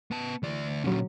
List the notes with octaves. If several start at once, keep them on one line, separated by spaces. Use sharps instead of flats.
B3 A5
D2 E3 D5
A#2 D3 F#3 C#4